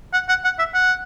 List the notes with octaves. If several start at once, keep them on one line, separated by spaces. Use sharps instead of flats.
F#5
F#5
F#5
E5
F#5